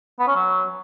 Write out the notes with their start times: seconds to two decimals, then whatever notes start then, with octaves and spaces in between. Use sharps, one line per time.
0.19 B3
0.28 C#4
0.36 F#3